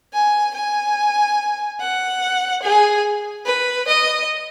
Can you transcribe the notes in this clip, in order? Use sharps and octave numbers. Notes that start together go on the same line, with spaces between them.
G#5
G#5
F#5
G#4
B4
D#5